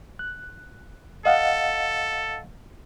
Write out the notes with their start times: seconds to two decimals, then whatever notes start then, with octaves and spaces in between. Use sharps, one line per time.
0.19 F#6
1.25 A4 D#5 F5 F#5